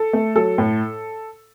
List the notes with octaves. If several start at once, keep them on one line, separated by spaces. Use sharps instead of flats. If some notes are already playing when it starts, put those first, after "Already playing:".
Already playing: A4
A3
F#3 A4
A2